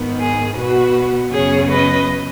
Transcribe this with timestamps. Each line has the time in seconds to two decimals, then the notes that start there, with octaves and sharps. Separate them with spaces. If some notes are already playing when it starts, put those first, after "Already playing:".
Already playing: G#2 D#3 B3
0.19 G#4
0.56 B2 B3 F#4 B4
1.32 F#2 C#3 B3 G#4 C#5
1.71 B4 D#5